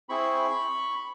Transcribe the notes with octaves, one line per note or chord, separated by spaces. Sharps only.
C4 E4 G#4 B5 C#6